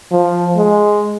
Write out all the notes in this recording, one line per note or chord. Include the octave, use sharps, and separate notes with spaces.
F3
G#3